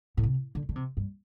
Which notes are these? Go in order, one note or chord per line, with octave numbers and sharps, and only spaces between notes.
A2
C3
D3
D3
C3
G2